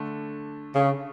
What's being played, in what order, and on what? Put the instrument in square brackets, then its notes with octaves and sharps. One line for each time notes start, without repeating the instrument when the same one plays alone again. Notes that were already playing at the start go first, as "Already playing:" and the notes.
Already playing: [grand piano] D3 A3 D4
[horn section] C#3